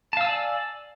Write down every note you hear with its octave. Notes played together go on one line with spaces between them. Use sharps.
D5 F5 G#5 A5 E6